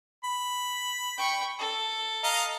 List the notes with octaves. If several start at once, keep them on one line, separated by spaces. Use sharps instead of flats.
B5
G5 C#6
A4
D#5 F5 A#5